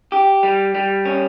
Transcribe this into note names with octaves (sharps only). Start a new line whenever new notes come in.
G4
G3
G3
C#4